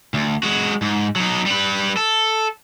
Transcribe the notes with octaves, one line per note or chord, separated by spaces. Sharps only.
D2
G#3 F#4
G#2
F#3 D#4
G3 B4
A4